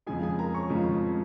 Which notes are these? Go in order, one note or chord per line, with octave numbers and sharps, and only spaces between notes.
F2 C#3 F3 G#3 G#4 G#5
G#4 G#5
A#4 A#5
C#5 C#6
F2 C#3 F3 G#3